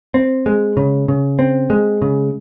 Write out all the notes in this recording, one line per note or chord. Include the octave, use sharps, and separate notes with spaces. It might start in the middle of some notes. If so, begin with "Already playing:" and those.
C4
G#3
C#3
C#3
C4
G#3
C#3